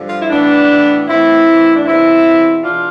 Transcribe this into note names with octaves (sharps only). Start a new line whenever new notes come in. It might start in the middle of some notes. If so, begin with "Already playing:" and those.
Already playing: G2 D3 F3
F4
E4
A2 E3 B3 D4
A2 E3
A2 E3 C4 E4
A2 E3
D4
E2 B2 C4 E4
E2 B2
E2 B2 D4 F4